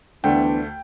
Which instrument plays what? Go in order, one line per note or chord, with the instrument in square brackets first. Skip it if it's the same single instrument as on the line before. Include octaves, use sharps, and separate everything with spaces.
[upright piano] D2 A3 [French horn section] E3 B3 D4 [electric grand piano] G5